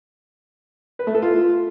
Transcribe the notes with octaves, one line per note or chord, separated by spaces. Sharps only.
B4
A3
A4
F4